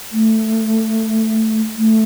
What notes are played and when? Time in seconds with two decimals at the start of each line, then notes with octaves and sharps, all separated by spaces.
0.12 A3
1.76 A3